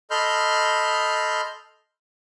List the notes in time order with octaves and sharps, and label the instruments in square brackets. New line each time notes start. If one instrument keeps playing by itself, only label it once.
[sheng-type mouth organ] A4 D#5 B5 C6 F6 G6